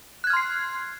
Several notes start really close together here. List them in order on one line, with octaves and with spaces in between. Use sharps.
F#6 G#6 F6 C6 C7